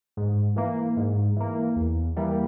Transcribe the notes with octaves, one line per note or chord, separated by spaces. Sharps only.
G#2
E3 A#3
G#2
E3 A#3
E2
E3 G3 A#3